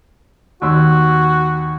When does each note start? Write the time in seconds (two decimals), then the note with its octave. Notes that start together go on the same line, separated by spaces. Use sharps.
0.62 D#2 F#4 C6 E6